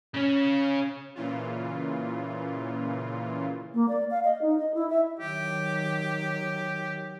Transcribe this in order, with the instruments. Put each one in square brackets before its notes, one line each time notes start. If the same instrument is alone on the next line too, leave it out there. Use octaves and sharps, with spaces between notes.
[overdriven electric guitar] C#3 C#4
[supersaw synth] A#2 C#3 E3 F4
[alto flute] A#3
D5
F5
D#5
D#4
D#5
E4
E5
[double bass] D#3 F#3 [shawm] G4